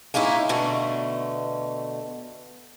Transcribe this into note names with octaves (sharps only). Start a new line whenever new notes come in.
G#3 A#3 C#4 D#4 E4
B2 D3 A3